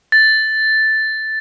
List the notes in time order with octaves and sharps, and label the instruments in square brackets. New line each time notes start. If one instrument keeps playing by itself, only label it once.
[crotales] A6